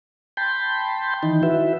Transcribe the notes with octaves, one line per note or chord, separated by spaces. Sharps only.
G5 A5 B5 C6 G6
D#3 E3 D#4
E4 F#4 B4 E5